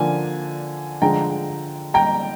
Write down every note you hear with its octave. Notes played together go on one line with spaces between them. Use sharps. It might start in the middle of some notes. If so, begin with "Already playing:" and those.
Already playing: D3 F3 A#3 D4 G#5
D3 F3 G#3 G5 A#5
G5 A#5